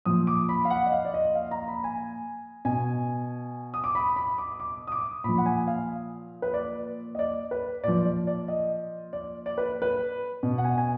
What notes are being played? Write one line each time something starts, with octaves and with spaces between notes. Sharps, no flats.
A#2 F3 D#6
D6
B5
F5
F#5
D#5
F5
D5
D#5
F5
A#5
B5
G#5
B2 G#5
D#6
D6
B5
B5
D6
D6
D#6
D6
A#2 F3 B5
F#5
G#5
F5
B4
D5
D#5
D5
B4
A#2 F3 D5
D5
D5
D#5
D5
D5
B4
B4
B2
F#5
G#5
G#5